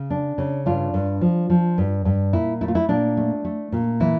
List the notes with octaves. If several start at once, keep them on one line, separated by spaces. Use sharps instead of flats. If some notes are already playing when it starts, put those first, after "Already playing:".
Already playing: C#3
D4
C#3
G2 D4 F4
G2
F3
F3
G2
G2
A#2 E4
A3 E4
F4
E4
A#2 D4
A3
A3
A#2
E3 E4